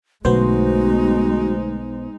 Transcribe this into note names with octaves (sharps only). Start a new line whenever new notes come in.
B1 D3 G#3 A3 B3 D#4 F#4 C5